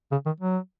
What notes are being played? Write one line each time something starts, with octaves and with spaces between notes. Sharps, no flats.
C#3
D#3
F#3